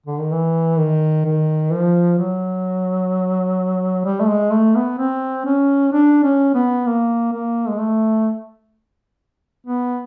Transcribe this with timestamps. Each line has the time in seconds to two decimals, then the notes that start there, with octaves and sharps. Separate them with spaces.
0.06 D3
0.19 D#3
0.32 E3
0.79 D#3
1.25 D#3
1.71 F3
2.19 F#3
4.05 G3
4.20 A3
4.29 G#3
4.52 A3
4.75 B3
4.98 C4
5.46 C#4
5.93 D4
6.24 C#4
6.55 B3
6.86 A#3
7.32 A#3
7.69 G#3
7.79 A3
9.66 B3